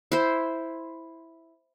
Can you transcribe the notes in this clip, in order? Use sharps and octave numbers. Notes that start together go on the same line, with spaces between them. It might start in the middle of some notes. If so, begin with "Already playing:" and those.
E4 C5